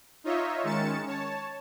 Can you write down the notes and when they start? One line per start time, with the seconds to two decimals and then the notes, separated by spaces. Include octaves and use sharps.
0.24 D#4 F4 C#5 D#5 E5
0.63 D#3 G#3 C#4 A6 C#7 E7
1.07 C#5 A5